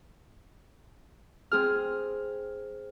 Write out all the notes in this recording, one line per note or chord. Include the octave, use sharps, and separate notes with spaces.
C4 G#4 F6